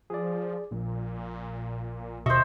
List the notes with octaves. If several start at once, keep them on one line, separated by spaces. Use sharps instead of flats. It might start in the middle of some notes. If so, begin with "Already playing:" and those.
F3 G#4 D5
A#1 A#2
D#2 B2 C5 D#5 E5 C#6